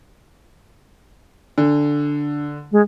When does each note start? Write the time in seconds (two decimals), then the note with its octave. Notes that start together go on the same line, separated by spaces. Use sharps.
1.58 D3 D4
2.72 G#3